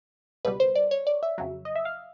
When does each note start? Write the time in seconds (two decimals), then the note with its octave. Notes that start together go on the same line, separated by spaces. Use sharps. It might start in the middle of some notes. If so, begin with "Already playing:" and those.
0.45 C#2 B2 G3 B4
0.60 C5
0.75 D5
0.91 C#5
1.07 D5
1.23 E5
1.38 F2 C#3 F#3
1.65 D#5
1.75 E5
1.85 F5